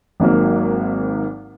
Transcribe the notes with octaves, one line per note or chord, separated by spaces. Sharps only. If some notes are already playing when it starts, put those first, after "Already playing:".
G#1 G#2 F#3 A#3